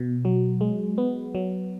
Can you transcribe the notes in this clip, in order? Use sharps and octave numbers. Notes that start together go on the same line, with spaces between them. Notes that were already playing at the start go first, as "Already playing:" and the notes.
Already playing: B2
F#3
G#3
B3
F#3